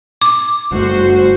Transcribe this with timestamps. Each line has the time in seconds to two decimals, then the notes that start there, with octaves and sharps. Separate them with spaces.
0.21 D6
0.72 F#1 G2 A3 F#4 C5